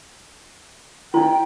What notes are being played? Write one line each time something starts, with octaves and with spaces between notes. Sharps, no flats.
D#4 E4 G5